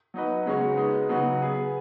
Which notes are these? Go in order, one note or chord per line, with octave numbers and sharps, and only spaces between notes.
F#3 D#4 F#4 B4 D#5
C#3 G#3 C#4 F#4 C#5
G#3 B3 D#4
C#3 F#3 D#4 F#4 B4
B3 G#4 B4